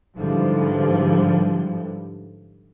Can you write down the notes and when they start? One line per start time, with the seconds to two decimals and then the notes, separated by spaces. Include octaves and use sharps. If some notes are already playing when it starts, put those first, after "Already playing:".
0.17 G#2 D3 E3 F3 G3